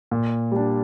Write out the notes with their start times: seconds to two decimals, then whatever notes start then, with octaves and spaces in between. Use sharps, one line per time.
0.11 A#2
0.52 G3 D4